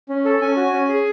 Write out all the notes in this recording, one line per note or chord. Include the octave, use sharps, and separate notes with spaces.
C#4
A4
C#4 G#5
F#4
C#4
G#4